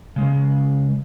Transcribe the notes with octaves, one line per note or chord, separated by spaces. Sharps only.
C#3 G#3